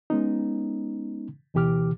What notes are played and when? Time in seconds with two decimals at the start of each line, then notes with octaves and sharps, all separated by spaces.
0.10 G#3 B3 C#4 D#4
1.54 D2 B2 E3 G4 D6 F6